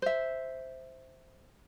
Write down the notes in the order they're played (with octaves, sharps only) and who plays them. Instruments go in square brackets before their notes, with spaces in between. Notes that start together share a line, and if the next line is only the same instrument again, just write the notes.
[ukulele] C5 E5